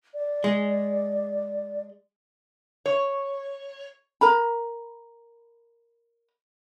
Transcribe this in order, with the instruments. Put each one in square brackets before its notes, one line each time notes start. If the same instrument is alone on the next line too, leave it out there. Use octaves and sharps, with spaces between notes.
[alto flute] D5
[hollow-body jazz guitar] G#3
[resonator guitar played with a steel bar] C#5
[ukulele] A#4 A#5 B5